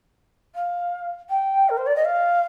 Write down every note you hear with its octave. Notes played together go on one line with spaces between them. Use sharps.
F5
G5
A#4
C5
D5
D#5
F5